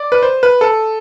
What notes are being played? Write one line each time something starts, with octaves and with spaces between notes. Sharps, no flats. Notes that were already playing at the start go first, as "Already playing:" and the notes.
Already playing: D5
B4
C5
B4
A4